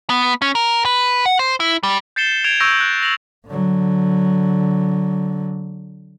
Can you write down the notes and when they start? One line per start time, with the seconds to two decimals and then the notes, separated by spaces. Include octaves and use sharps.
0.10 B3
0.42 C#4
0.55 A#4
0.85 B4
1.26 F#5
1.39 C5
1.60 E4
1.83 G3
2.16 G6 A6 C7 C#7 E7 G7
2.44 G#6 D7 F7
2.60 C#6 E6 G6 A#6 D7
2.80 F#6
3.03 A#6 F7 F#7
3.47 D3 F#3